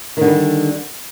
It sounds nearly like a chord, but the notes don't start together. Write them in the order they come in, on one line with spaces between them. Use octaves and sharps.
D#3 D3 G3